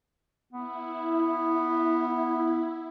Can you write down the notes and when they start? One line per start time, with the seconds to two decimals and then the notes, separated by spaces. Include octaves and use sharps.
0.53 B3 E4